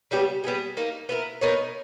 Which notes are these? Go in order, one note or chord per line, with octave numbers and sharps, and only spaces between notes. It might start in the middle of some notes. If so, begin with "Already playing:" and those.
C#3 G3 B3 G4
G3 B3 D#4 G#4
A#3 D#4 A#4
B3 E4 A#4
B3 D#4 A#4 C#5